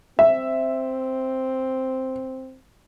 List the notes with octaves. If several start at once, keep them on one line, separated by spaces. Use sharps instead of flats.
C4 E5